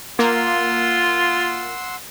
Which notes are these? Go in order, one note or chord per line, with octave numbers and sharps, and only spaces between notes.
A#3 F4 F#5 C6 E6